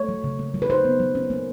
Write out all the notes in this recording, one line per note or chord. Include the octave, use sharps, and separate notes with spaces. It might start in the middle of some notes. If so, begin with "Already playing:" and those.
Already playing: A3 C#5
F#3
C#3
A#3
F#3
B4
D#4 C5
B3
F#3
C#4
A#3